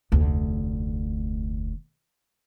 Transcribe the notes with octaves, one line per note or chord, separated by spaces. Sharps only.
F1 D2